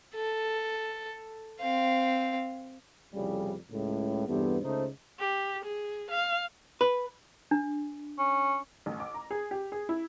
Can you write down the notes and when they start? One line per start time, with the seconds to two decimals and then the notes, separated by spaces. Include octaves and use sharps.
0.15 A4
1.61 C4 F5
3.14 C2 F2 A2 C#3 G3
3.71 C#2 A2
4.28 E2 G2 C3 A3 B3
4.62 C#2 C#3 A3 D#4 C5
5.19 G4
5.64 G#4
6.10 F5
6.81 B4
7.51 D4
8.19 C#4
8.86 A1
9.00 D6
9.14 A#5
9.31 G#4
9.51 G4
9.72 G#4
9.89 E4